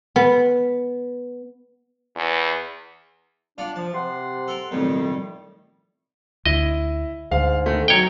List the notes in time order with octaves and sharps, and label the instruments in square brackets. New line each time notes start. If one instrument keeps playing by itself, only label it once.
[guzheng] B3
[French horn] E2
[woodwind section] D4 [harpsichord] F4 D5 F#5
[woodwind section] F3 [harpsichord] A5
[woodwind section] C3 F#5 C6
[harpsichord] A4 A#4
[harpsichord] B1 F2 A2 [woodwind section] D#3 G3
[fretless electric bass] D2 [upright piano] E4 [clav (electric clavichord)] D#5
[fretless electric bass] D2 [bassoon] G#2 [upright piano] F5
[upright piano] D#3 A3
[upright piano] F#3 D#4 [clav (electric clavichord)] C#5 G5